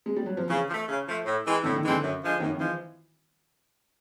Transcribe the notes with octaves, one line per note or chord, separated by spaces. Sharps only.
G#3
G3
F#3
F3
C#3 E3
F3
A3
C#3
F3 A3
A2
E3 G#3 C4
A2 D3
D#3
D3 E3 G#3 C4
F#2
D3 F3 G#3
F#2 D#3
D#3
E3 F3 G#3